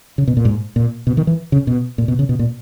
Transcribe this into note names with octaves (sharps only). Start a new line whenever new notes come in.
C#3
B2
A#2
G#2
A#2
B2
D#3
E3
C#3
B2
A#2
B2
C#3
B2
A#2